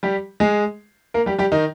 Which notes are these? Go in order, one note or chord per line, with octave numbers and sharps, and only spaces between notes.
G3 G4
G#3 G#4
A#3 A#4
G3 G4
G3 G4
D#3 D#4